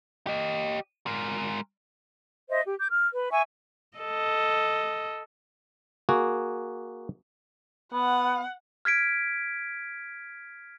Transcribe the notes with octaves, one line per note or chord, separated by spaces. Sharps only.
G4 D#5
G#3 A#4
C5 D#5 E5
G4
D6 G6
F6
B4
E5 G#5 C#6
A4 D#5
A#3 F#4 G#4
B3 F#5
F6 G#6 B6 D7